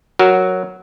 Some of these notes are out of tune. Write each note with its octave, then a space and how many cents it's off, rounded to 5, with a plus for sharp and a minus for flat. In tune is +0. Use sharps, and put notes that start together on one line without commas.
F#3 +0 F#4 +5 A#4 +0